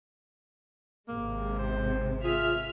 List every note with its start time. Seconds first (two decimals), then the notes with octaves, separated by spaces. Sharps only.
1.08 G#1 C3 G#3 A#3
1.59 C5
2.24 F4 G#4 E5 F6